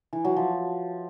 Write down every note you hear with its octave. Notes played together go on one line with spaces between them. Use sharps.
E3
F#3
F3